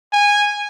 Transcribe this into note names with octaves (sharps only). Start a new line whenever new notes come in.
G#5